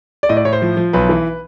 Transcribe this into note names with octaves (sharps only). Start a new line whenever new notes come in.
D5
A2 D#5
D5
A2 C#5
C5
F3
F3
B1 B4
E3